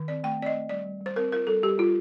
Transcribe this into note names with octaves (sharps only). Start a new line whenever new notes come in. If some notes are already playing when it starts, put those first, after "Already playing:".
Already playing: D#3
C4 D5
A3 G5
C4 D5
D#5
A3
G3 D5
G3
G3
C5
C4 A#4
F4 A#4
G3 A4
G3 G4
G3 F4